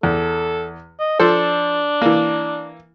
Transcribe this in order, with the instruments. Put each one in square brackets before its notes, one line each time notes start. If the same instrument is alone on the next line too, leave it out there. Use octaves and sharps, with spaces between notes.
[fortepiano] E2 [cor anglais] A4
[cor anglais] D#5
[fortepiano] F3 A4 C5 [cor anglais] D4
[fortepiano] E3 A#3